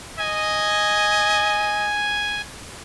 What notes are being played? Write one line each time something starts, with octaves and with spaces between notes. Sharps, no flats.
D#5 G#5